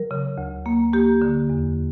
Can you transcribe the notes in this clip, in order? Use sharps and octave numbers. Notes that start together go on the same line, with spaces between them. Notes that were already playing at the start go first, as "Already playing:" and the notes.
Already playing: F#3 A#4
C#3
D2
A#3
A#3 G4
D3
E2